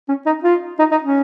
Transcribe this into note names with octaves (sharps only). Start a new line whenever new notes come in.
C#4
D#4
F4
D#4
D#4
C#4